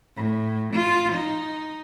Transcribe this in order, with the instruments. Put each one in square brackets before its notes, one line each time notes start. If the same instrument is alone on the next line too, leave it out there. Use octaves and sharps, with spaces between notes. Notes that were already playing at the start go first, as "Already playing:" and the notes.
[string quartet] A2
F4
D#4